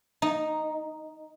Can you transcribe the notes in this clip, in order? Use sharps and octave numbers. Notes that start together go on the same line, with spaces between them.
D#4